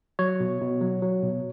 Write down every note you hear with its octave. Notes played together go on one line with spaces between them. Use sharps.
F#3 C#5
B2
B2
F#3
F#3
B2